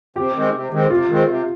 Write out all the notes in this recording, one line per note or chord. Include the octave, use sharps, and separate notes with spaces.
C3 G4
D#3 G#3 C4
C3
D#3 G#3 C4
C3 F4
D#3 G#3 C4
C3